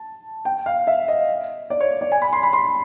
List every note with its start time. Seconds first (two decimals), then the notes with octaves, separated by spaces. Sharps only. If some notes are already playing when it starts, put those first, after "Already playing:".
Already playing: A5
0.45 G5
0.66 F5
0.87 E5
1.08 D#5
1.70 D5
1.80 C#5
2.01 D5
2.12 G#5
2.22 B5
2.33 C6
2.43 B5
2.53 C6